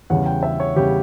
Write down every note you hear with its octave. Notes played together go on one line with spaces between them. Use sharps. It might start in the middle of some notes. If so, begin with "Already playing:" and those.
E2 C#3 G3 F#5
G5
E5
C#5
E2 C#3 G3 G4